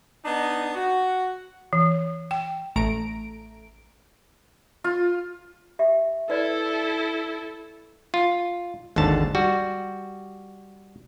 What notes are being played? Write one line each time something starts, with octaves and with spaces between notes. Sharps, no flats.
B3 D4 D#4
F#4
E3
G5
A1 A3 A#5 D7
F4
G4 E5
E4 A4 B4 D5
F4
G#1 D#2 D3 A5
G3 F#4